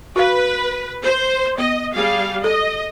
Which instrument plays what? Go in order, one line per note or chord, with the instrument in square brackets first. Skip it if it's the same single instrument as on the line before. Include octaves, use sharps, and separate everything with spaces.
[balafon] F#4 F5 [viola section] B4
[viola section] C5
[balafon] B3 [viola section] D#5
[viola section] G3 G#4 F5
[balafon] A4 [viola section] D#5